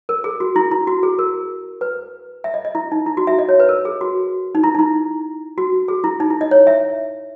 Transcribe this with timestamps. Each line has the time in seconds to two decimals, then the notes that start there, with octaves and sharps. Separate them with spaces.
0.09 A#4
0.24 G#4
0.40 F#4
0.56 E4
0.71 E4
0.87 F#4
1.03 G#4
1.19 A#4
1.81 B4
2.44 E5
2.54 D#5
2.65 D#5
2.75 E4
2.92 D#4
3.06 E4
3.17 F#4
3.27 E5
3.39 D#5
3.49 C#5
3.60 B4
3.69 A#4
3.85 G#4
4.01 F#4
4.55 D#4
4.63 E4
4.75 D#4
4.79 E4
5.58 F#4
5.88 G#4
6.04 E4
6.20 D#4
6.31 E4
6.41 D#5
6.51 C#5
6.67 E5